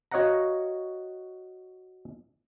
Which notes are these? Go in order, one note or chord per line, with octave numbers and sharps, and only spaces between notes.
F#4 C#5 D#5 F5 F#5 A#5